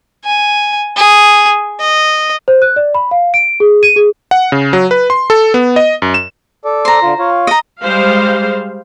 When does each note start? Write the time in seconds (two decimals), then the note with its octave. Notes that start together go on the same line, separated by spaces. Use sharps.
0.24 G#5
0.96 G#4
1.80 D#5
2.48 C5
2.62 F#6
2.76 D5
2.95 B5
3.11 F5
3.34 D7
3.60 G#4
3.83 D#7
3.96 G#4
4.31 F#5
4.52 C#3
4.73 F#3
4.91 B4
5.10 C6
5.30 A4
5.54 B3
5.76 D#5
6.02 F#2
6.14 E7
6.65 A4 D5
6.85 C5 A#5
7.03 D3 F4
7.19 F4 C#5 F5
7.47 D#5 A#5
7.82 G3 G#3 C5 F5